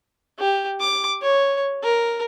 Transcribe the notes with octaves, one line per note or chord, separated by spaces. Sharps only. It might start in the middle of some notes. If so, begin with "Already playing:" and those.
G4
D6
C#5
A#4